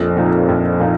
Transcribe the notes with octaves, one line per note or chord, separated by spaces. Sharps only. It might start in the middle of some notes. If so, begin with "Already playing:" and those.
Already playing: A#1 F2
A#2 F3 A#3 D#4
A#1
A#2 F3 A#3 D#4